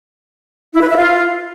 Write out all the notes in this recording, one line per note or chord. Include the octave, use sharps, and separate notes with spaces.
E4
B4
E5
F4